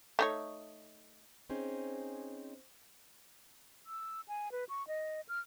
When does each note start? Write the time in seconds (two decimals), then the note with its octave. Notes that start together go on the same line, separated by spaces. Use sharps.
0.19 A3 D#4 C#5
1.50 C4 C#4 D#4 G#4 C5
3.86 E6
4.28 G#5
4.52 B4
4.69 C#6
4.88 D#5
5.29 F6